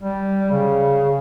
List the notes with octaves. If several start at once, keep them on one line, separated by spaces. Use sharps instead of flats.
G3
C#3